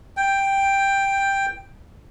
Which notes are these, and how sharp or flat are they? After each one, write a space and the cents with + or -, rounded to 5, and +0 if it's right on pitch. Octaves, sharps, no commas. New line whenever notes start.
G5 +5